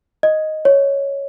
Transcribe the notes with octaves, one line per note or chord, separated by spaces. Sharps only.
D#5
C#5